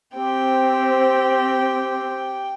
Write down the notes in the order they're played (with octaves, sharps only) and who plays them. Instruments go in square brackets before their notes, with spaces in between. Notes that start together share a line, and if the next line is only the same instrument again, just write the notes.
[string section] C4 [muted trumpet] G4 [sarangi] G5